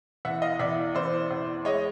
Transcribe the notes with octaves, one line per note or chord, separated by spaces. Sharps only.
E2 E5 F#5
D#5 F5
E2 D5 E5
E2 C5 D5
E2
G#3 C#5 D#5